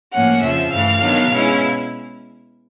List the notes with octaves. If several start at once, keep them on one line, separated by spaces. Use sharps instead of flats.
A2 F3 A#3 C#4 F#5
F2 C#3 F3 E5
G2 E3 A3 F5
D#3 F#3 B3 D4
B2 G#3 C#4 E4